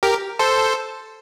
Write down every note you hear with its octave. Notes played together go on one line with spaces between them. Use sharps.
G4 A#4
A4 C5